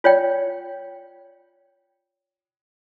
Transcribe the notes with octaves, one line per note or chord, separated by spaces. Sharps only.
F4 C#5 D5 G5